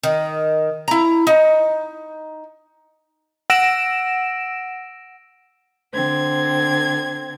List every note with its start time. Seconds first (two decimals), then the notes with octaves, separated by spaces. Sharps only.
0.03 D#3
0.88 E4 A#5
1.27 D#4
3.50 F#5 E6 A#6 D7 E7
5.93 D3 C4 G#6